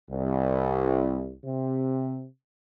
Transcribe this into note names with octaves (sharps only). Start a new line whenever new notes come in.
C2
C3